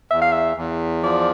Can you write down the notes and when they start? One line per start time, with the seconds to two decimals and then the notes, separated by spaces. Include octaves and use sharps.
0.11 E2 E5
0.22 F5
0.32 E5
0.57 E2
1.03 F3 D5